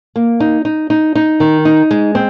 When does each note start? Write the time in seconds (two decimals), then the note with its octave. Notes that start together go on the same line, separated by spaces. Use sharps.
0.16 A#3
0.40 D#4
0.65 D#4
0.90 D#4
1.15 D#4
1.40 D#3
1.65 D#4
1.91 G#3
2.15 C4